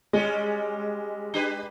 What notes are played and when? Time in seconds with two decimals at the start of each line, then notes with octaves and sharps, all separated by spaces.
0.13 G3 G#3 C#4
1.34 D4 G4 B4